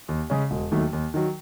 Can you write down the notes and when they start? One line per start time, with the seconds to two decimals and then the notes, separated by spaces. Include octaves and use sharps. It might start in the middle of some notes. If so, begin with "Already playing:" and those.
0.09 D#2
0.30 C#3 G#3 C#4
0.51 E1
0.71 D#2 D#3 F#3 A3
0.93 D#2
1.14 D#3 F#3